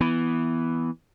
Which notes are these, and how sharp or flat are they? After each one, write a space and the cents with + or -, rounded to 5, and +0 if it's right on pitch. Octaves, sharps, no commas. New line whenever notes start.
E3 +0 B3 +0